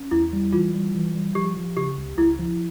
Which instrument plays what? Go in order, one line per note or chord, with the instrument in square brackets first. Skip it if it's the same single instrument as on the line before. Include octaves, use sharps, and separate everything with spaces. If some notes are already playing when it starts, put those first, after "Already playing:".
Already playing: [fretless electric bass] C#4
[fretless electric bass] E2 [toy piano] E4
[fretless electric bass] G3
[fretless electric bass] E3 [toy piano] F4
[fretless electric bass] G3
E3
G3
[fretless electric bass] F3 [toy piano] G4
[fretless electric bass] F3
[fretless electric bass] C#3 [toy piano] G4
[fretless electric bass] C#2
[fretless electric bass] C#2 [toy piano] E4
[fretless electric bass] F3